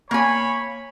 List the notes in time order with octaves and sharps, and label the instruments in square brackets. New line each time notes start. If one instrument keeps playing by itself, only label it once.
[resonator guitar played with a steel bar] A#3 G#5 [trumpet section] C#5 [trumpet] B5